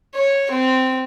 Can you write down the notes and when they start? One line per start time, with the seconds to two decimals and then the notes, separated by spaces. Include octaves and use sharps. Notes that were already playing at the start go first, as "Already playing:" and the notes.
0.15 C#5
0.51 C4